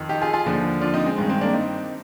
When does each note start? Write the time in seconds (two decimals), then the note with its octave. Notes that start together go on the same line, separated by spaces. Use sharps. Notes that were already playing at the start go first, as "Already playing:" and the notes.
Already playing: F2 D#3
0.09 D#4 G4
0.21 F4 G#4
0.33 F4 G#4
0.45 D#2 D3 F3
0.81 D4 F4
0.94 C4 D#4
1.06 G#3 C4
1.18 G2 G#3
1.20 D#3
1.29 G#3 C4
1.41 A#3 D4
1.53 C4 D#4